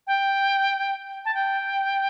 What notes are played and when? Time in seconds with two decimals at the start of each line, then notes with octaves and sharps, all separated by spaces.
0.07 G5
1.25 A5
1.35 G5